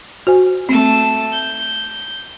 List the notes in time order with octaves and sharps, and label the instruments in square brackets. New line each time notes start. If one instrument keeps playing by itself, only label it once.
[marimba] F#4 C5 G#5
[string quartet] A3 A5 [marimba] C4
[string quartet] G6